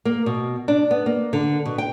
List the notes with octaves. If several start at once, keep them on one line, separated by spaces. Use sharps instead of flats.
A#3
B2
D4
B3
A#3
D3
B2
G5